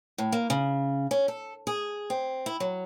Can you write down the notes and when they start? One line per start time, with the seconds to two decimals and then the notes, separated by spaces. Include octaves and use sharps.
0.18 A2
0.32 A#3
0.50 C#3
1.11 C#4
1.28 A4
1.67 G#4
2.10 C4
2.46 E4
2.60 F#3